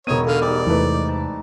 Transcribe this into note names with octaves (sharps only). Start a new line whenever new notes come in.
E1 B3 D#4 C#5 D#6 D#7
D3 A4 F5
G#2 G3 D#4 D5
E2 C3 E3 A3 B4
A5